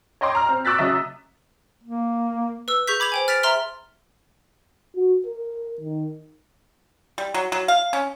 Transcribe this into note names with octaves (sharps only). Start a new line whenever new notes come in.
C#5 D#5 G5 C6 D6
A#5 F6
C4
C#6 D6 E6 F#6 A6 B6
C#3 F#3 D#5 E5 D#6
A#3
B4 E6
G#4 C#6 G6 B6
B5 D6 G#6 F7
C5 G5 G#5
F6 A6 B6 D7 F7
E5 A#5 C6 F6 G7
F#4
A#4
D#3
G3
F#3
F#3
F5
C#4